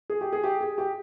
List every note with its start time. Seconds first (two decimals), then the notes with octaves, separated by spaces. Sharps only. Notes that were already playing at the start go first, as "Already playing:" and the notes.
0.10 G#4
0.21 G4
0.33 G#4
0.44 G4
0.61 G#4
0.78 G4